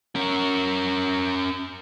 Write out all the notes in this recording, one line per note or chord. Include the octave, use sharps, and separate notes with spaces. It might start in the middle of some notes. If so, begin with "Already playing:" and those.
C#4 A#4